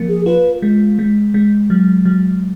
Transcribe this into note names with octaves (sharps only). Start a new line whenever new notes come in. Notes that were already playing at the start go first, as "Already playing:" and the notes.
Already playing: F3 A#3
G#4
F4 B4
G#3
G#3
G#3
F#3
F#3